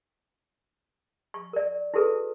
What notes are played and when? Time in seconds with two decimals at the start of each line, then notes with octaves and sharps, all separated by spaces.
1.34 C#6
1.53 A#4 D5
1.94 E4 F#4 G#4 A4 B4